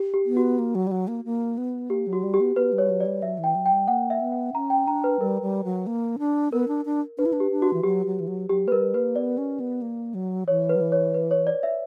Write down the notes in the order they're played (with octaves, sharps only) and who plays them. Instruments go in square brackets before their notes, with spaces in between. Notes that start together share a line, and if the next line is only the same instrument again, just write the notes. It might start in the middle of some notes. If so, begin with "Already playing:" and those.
Already playing: [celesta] G4
G4
[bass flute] B3
[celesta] F#4
[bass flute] A#3
F#3
G3
F#3
A#3
A#3
B3
[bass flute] A#3 [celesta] G4
[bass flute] F#3
[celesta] F#4
[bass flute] G3
[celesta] G4
[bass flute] B3
[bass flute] B3 [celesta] B4
[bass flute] G3
[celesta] C#5
[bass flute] F#3
[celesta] D5
[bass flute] G3
[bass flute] F#3 [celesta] E5
[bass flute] E3
[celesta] G5
[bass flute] F#3
[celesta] G5
[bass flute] G3
[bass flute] A#3 [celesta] F#5
[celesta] E5
[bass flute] B3
[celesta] F#5
[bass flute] C#4 [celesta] A#5
[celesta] G5
[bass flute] D4 [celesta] A#5
[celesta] B4
[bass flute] G3 [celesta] A#4
[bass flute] G3
F#3
A#3
D4
[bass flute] B3 [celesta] A#4
[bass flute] D4
D4
[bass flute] D4 [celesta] B4
[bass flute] E4
D4
[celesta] G4
[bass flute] D4
[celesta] F#4
[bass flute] E3
[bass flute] F#3 [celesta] G4
[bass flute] F#3
E3
F#3
[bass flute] F#3 [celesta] G4
[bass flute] A#3 [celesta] B4
[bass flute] G3 [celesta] A#4
[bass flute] A#3 [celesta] B4
[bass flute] B3 [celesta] D5
[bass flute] C#4
B3
A#3
F#3
[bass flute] E3 [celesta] C#5
[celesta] B4
[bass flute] F#3
E3
[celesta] C#5
B4
C#5
D5
E5